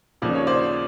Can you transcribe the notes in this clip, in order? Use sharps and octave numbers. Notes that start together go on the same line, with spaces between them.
D#2 C#3 F3 D5
C#5
C5 D5